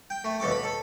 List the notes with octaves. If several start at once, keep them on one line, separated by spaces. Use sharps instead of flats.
G5
A3
D#2 B2 A4 D6
B5
A4